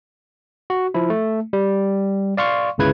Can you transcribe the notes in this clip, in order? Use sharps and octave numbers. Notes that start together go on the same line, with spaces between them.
F#4
F3 E4
A3
G3
D5 F5 C6 C#6
G1 C#2 C#3 E4 B4 G#6